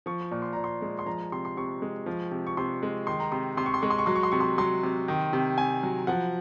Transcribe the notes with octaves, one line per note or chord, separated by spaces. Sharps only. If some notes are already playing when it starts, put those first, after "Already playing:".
F3 C#6
A#2 C#6
C6
A#2 A#5
C6
G#3
C6
F3 A#5
C3 C6
C6
C3 C#6
G#3
F3
C3
C#6
C3 C6
G#3
D#3 C6
A#5
C3 C6
C3 C6
C#6
C6
G#3 C#6
C6
C#6
F#3 C6
C#6
C6
C3 C#6
C6
F#3 C6
C3
D#3
C3
C3 G#5
F#3
F3 F#5